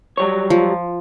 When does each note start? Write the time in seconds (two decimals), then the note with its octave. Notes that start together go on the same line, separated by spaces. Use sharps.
0.18 F#3 G3 C#5
0.50 F3